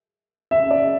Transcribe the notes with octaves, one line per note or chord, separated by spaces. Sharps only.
E5
D5